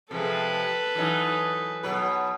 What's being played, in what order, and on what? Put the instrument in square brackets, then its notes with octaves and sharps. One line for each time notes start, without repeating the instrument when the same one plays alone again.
[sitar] C3 F3 G#3 [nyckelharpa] A4 B4
[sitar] E3 F#3 D#4
B2 F#3 B4